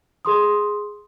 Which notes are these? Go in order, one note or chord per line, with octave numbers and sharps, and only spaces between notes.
G#4 C6 D#6